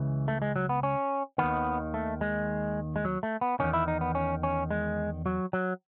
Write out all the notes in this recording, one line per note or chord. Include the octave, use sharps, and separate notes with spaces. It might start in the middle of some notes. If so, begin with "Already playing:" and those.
Already playing: C#2 C#3 E3
A3
G#3
F#3
B3
C#4
D#2 D#3 B3
A3
G#3
G#3
F#3
A3
B3
E2 D#3 C#4
E4
D#4
B3
C#4
C#4
G#3
F#3
F#3